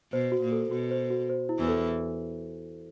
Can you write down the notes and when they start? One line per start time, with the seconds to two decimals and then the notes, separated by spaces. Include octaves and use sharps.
0.12 B2 C5
0.32 F#4
0.41 A#2
0.52 A4
0.71 B2 F#4
0.91 C5
1.10 F#4
1.29 C5
1.49 E4
1.59 E2 E3
1.68 A4